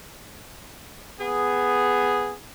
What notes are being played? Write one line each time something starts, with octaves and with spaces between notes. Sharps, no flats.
B3 G#4